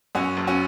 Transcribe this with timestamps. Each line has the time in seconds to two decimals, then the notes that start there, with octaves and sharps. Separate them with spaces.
0.15 F#2 C#4 F#4
0.37 F#1
0.47 C#4 F#4